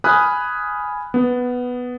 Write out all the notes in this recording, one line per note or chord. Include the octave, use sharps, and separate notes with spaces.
G#5 B5 D#6 F6 F#6
B3